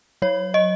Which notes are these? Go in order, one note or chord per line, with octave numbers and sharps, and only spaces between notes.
F#3 C#5
D#5